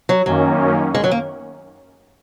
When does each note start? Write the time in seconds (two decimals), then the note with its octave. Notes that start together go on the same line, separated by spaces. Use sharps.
0.09 F#3
0.26 F#2 D#3 F#3 A#3 C#4
0.95 G#3
1.04 F#3
1.11 A#3